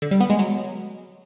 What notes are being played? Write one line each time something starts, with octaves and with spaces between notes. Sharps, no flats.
D3
G3
B3
G#3
F#3